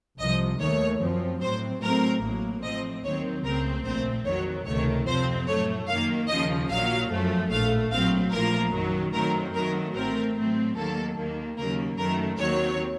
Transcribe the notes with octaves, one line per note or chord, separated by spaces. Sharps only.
C2 C3 F3 D#5
D#2 D#3 A3 C#5
F#2 F3 C4
A2 F#3 C4 C5
A2 F#3 A3 C4 A#4
A1 A2 F#3 A#3
A2 F3 C4 D#5
D#2 D#3 F#3 C4 C#5
C#2 C#3 A3 C4 A#4
A#1 A#2 A3 C4 C5
F2 D#3 F#3 C#5
C#2 C3 D#3 A3 C#5
F2 C3 F3 C4 C5
A2 F#3 A3 C#5
F#2 D#3 A#3 F5
D#2 C#3 F3 D#5
A#1 A#2 F#3 F5
F#2 F3 A3
A#1 A2 A3 F5
A#1 A2 F#3 C4 F5
A#1 A2 F3 A#3 A#4
F#2 D#3 F#3
F#2 D#3 F#3 A3 C4 A#4
F#2 D#3 F#3 A3 A#4
A1 A2 A3 C4 A#4
A2 F#3 A3 C4
D#2 D#3 F#3 A#3 A4
D#2 D#3 A#3
D#2 C#3 F#3 A#3 A#4
F#2 D#3 A3 A#4
D#2 D#3 F#3 C4 C#5